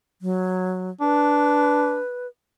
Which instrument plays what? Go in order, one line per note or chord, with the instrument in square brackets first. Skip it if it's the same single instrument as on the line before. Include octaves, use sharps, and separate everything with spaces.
[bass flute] F#3
[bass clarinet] D4 [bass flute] B4